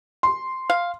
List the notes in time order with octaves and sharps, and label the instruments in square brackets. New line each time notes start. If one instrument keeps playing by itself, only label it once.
[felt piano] C6
[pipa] F5